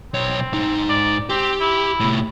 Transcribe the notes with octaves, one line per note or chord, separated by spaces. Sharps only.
B1 C4 C#5
G#2 D#4
D5
C4 G4
E4
A2 C3